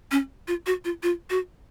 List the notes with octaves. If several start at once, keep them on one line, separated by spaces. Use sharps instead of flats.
C#4
F4
F#4
F4
F4
F#4